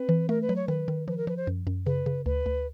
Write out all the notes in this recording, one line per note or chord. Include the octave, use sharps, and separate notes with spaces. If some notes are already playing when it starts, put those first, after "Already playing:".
Already playing: C4 B4
E3
A3 A#4
B4
F#3
C#5
D#3 B4
D#3
F3 B4
A#4
F3 B4
C5
F#2
F#2
C#3 B4
C#3
D2 B4
D2